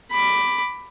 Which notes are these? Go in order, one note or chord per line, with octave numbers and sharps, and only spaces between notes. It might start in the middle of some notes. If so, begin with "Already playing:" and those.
B5 D6